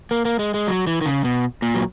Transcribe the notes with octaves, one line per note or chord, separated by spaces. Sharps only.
A#3
A#3
G#3
G#3
F#3
E3
D#3
C#3
B2
A#2
F#3